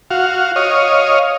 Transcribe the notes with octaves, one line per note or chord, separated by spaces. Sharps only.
F#4 F5
C#5 D#5 F5